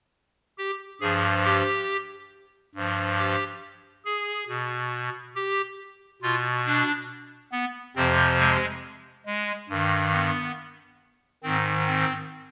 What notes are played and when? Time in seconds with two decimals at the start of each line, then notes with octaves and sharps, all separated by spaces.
0.58 G4
1.01 G2 F3 G#4
1.45 G4
2.75 G2 F3
3.18 G4
4.05 G#4
4.49 B2
5.35 G4
6.22 B2 F4
6.66 D4
7.52 B3
7.96 F2 C3 F3 C4
8.39 G#3
9.26 G#3
9.69 G2 D#3
10.13 B3
11.43 G#2 D#3 C4
11.87 C4